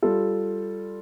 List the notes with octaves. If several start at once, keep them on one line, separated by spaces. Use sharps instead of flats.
G3 F4 A4